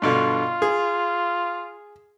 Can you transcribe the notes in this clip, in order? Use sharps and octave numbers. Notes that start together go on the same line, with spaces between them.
G2 B2 D3 F4
G#4